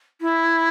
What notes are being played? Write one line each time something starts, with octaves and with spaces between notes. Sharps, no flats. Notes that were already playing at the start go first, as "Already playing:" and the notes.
E4